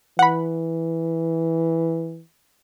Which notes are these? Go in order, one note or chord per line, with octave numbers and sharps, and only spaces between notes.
E3 F#5 B5